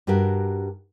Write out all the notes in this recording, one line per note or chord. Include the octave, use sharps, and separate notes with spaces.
G2 D4 F#4 G4 A#4